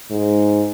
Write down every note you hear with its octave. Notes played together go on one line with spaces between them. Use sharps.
G#2